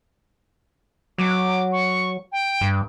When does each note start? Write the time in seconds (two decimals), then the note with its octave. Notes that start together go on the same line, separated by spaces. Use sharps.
1.18 F#3 D6
1.72 C#6
2.32 G5
2.61 G2